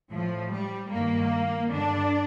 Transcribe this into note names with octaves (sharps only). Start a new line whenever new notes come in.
A2 F3
G3
G2 D#3 A#3
G2 D3 D4